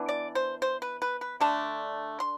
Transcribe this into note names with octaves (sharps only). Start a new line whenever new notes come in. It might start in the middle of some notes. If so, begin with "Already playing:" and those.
Already playing: E3 B3 D4
D5
C5
C5
B4
B4
B4
D3 A3 D4 A5
C6